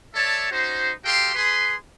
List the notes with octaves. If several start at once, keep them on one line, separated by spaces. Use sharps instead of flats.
A4 C#5 D5 E5 A5
C#4 D#4 F#4 C5
F#4 G4 A4 F5 G5 C6
G#4 B4 C6